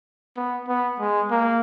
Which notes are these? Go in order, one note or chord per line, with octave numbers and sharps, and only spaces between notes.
B3
B3
G#3
A#3